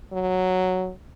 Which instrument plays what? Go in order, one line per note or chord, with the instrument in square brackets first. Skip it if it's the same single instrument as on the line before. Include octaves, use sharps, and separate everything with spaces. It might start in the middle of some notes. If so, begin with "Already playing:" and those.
[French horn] F#3